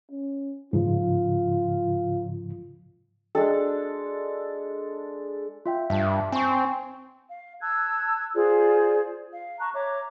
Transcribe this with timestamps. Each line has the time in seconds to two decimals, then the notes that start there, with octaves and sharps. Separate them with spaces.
0.11 C#4
0.73 G#2 C#3 F3 F4
3.35 G#3 D4 A4
5.66 F4 E5 G5
5.90 G2 E5 A5
6.32 C4 G#5 C6 C#6
7.29 F5
7.61 A5 E6 F#6 G#6
8.35 F4 G#4 C5 D5
9.31 F5
9.59 A5 A#5 C#6 F#6
9.74 C#5 E5 A#5 D6